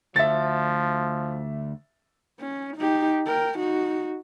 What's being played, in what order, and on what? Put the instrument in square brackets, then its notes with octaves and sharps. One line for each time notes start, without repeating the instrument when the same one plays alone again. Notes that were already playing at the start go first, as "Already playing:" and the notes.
[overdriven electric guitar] D2 [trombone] F3 [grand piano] E5 A6
[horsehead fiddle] C#4
D#4 G4
A#4 G5
D#4 F#4